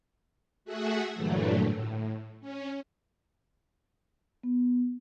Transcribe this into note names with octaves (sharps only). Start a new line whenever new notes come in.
A3 F#4 G#4 E5 F#5
G2 A#2 D3 E3 F#3 A3
A2
C#4
B3